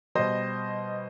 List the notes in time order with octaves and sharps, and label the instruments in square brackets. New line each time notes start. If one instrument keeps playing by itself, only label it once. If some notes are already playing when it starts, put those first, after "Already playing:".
[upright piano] B2 G3 C5 D#5